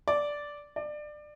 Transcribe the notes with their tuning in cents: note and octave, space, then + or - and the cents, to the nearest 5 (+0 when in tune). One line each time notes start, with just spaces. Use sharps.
D5 -5
D5 +25